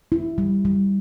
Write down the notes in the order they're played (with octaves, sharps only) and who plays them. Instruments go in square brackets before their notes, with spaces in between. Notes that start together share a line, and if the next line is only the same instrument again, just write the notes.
[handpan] E4
G3
G3